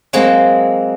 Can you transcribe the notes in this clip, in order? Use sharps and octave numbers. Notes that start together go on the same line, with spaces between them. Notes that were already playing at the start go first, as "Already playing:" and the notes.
F#3 G#3 A#3 C4